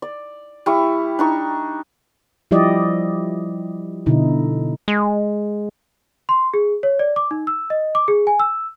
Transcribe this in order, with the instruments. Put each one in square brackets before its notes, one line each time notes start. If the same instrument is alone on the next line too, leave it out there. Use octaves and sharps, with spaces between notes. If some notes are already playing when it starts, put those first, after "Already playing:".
[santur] D5
G3 E4 C#6
D4 D#4 C#6
[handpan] F3 G3 E4 G4 D5 D#5
B2 D3 D#4 E4
[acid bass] G#3
[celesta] C6
G#4
C#5
D5
D6
D#4
E6
D#5
D6
G#4
G#5
E6